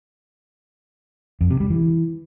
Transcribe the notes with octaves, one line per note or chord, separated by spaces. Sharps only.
F2
C3
G3
E3